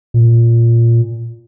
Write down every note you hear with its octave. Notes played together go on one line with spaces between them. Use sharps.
A#2